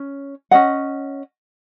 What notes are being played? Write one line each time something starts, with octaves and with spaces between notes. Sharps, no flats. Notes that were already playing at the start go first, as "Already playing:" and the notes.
Already playing: C#4
C#4 F#4 D#5 F#5